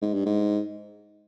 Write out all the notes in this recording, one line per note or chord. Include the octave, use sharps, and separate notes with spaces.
G#2
G2
G#2